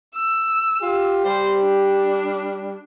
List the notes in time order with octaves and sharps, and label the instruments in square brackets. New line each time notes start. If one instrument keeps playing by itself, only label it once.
[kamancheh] E6
[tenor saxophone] F4 [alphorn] G4
[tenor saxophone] G3 [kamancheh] C5
[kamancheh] D4